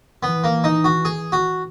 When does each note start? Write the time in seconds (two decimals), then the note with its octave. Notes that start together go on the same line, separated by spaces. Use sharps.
0.23 E3 B3
0.44 A#3
0.64 D#4
0.84 F#4
1.05 G#4
1.32 F#4